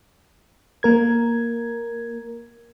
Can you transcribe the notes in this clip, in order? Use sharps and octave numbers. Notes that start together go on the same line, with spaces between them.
A#3 A#4 G#6